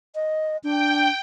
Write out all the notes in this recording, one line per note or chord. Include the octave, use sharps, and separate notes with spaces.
D#5
D4 G5